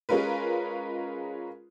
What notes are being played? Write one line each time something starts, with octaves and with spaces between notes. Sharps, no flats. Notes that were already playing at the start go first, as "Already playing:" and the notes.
G#3 C#4 F4 A#4 B4